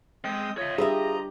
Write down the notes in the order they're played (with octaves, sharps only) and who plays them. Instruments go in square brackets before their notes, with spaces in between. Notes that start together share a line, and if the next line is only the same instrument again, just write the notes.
[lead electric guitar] G#3 [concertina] C4 G5 D#6
[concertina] F4 D#5 [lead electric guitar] C#5 E5
[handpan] G3 D4 G4 [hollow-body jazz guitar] G#4 B4 E5 [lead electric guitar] A#5